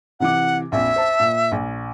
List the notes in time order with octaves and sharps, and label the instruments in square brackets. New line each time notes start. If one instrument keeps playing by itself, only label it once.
[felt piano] C3 E3 D6 [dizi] F#5
[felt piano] A#1 F2 [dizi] E5
[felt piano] C5 A5
A#2
A#1